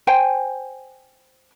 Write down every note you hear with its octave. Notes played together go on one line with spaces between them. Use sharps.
C5 G5 G#5